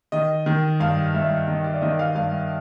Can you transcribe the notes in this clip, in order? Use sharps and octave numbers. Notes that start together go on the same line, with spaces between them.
D#3 D#5
D#3
G2 F5
G2 E5
D#3 D#5
D5
D#3 D#5
F5
G2 F5